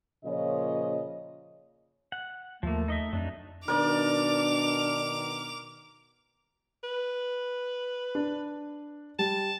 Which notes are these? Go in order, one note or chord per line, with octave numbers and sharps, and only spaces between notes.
A#2 C#3 F3 C#5 D#5
F#5
D#2 F3 A3 A#3
D#4 D#5 E5
F2 F#3 D4 D#4
B2 D#3 D4 A#4 D5 D6 F7
B4
D4
G3 A5